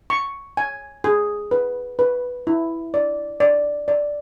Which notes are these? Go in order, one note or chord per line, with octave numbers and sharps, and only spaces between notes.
C#6
G#5
G#4
B4
B4
E4
D5
D5
D5